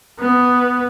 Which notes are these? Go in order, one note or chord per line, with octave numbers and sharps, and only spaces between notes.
B3